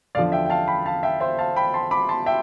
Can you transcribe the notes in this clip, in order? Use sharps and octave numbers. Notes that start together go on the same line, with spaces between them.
E2 D3 F3 D5 F5
E5 G5
G5
F5 A5
G5 B5
F5 A5
E5 G5
C5 E5
F5 A5
G5 B5
A5 C6
B5 D6
A5 C6
E5 G5